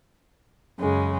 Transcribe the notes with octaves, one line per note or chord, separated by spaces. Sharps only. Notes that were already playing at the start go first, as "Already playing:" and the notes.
F#2 C#3 G#3